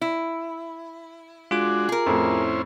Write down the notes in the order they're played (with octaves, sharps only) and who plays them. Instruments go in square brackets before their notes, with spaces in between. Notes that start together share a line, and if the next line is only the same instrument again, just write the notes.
[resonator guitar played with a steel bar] E4
[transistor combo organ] G#3 D4 F#4 [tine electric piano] F4 D6
[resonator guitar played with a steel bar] G#4 A#4
[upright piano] F2 A2 [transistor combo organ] C#4 E4 C5